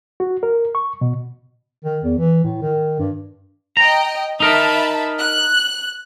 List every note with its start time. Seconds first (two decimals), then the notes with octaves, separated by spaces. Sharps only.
0.20 F#4
0.43 A#4
0.75 C#6
1.01 B2
1.84 D#3
2.04 E2
2.18 E3
2.44 A2
2.62 D#3
2.99 G2
3.77 D#5 G5 A#5
4.40 D#4 A#4 E5 A5 B5
5.20 F#6